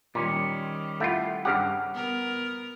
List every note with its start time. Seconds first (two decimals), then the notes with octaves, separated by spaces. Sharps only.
0.15 A#2 D#3 G3 C#4
1.00 A3 E4 F4 F#5
1.45 G2 C#3 G4 F#5 F6
1.94 B3 A#4